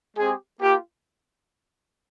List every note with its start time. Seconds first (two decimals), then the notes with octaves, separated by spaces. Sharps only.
0.17 G#3 C4 G4 G#4
0.61 A#3 F4 G4